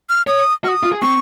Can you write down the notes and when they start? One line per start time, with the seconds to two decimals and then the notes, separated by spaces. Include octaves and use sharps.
0.09 F6
0.27 C#5 D#6
0.64 F#4 F6
0.68 D#6
0.83 F4
0.92 G#4
1.02 C4 C#6